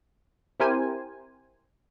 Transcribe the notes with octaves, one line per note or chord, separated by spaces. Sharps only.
C4 E4 G4 A#4 C5 G#5